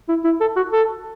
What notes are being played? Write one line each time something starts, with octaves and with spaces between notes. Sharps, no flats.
E4
E4
A4
F#4
A4